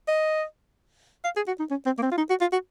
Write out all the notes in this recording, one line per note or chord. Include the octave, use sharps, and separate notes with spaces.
D#5
F5
G#4
F#4
D#4
C#4
C4
A#3
C4
F4
D#4
F#4
F4
F#4